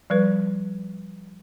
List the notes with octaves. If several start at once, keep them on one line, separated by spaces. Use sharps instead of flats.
F3 G3 B4